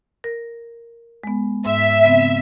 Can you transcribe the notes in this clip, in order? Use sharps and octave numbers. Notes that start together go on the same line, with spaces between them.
A#4
G#3 B3
G#2 E5 E6
C#3 B3 C4